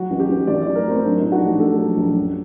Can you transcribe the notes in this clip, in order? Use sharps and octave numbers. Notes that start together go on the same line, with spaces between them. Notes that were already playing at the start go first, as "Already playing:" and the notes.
Already playing: F#3 F#4
A1
G4
A1
A1 D5
F#3 D5
A#4
F#3 C4
F#3 D4
A2 D#4
F#4
A#1 G4
A#1 A4
F#3
A#1
F#2